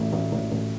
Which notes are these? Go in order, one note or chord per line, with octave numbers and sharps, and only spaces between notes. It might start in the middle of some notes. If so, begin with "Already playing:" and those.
Already playing: A1 A3
A1
A1
A1